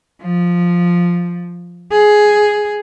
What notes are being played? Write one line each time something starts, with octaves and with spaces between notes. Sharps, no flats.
F3
G#4